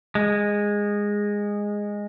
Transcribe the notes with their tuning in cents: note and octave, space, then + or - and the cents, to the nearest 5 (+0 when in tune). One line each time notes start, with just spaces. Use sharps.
G#3 -10